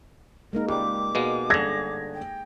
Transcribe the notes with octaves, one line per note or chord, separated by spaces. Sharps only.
G#3 A#3 D#4 A#4
C#2 G4 D5 D6
B2 G#3 A#3
G1 D3 G#4 G#6 A#6
G5